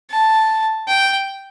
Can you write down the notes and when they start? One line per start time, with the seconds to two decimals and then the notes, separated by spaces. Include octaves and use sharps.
0.11 A5
0.88 G5